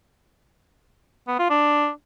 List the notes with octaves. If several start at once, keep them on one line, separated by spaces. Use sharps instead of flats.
B3
F4
D4